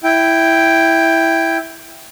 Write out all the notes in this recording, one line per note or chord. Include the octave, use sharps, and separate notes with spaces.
E4 G5